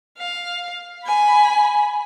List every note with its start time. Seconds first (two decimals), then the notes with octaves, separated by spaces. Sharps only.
0.18 F5
1.04 G#5 B5